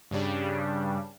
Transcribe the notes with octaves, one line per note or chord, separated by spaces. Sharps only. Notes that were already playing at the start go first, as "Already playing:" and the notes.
G2 C#3 G3 D4